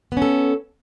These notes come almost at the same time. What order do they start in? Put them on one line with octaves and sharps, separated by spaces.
B3 C#4 A4